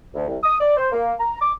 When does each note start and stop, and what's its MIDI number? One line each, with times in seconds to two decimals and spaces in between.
0.15 0.24 38
0.27 0.37 36
0.42 0.55 87
0.59 0.76 74
0.77 0.88 72
0.92 1.12 58
1.19 1.40 82
1.41 1.51 86